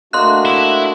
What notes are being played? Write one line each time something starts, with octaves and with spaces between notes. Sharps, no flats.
A3 A#3 D4 F#4 D#5 C6 F#6
E4